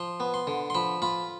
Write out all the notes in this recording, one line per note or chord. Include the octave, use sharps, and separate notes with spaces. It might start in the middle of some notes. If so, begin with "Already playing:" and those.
Already playing: F3 C6
B3
C6
D3
C6
F3 B5
F4 B5